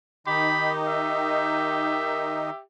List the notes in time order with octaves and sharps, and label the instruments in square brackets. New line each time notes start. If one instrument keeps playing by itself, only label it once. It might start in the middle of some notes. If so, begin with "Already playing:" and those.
[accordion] D#3 D#4 [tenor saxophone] G4 [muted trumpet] B5
[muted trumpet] E5